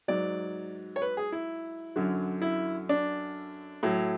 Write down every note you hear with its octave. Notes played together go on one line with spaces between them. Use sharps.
G#2 F#3 D5
C#5
B4
G#4
E4
F#2 D3 F#3
E4
D4
A2 F#3